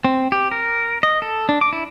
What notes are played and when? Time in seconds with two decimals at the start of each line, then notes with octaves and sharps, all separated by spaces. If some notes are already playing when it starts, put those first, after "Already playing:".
0.05 C4
0.32 G4
0.51 A#4
1.03 D#5
1.22 A4
1.49 D4
1.61 D6
1.73 E4